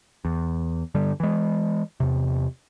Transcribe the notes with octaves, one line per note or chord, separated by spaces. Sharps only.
E2
G2 D3 G3
E3 G#3
E2 C3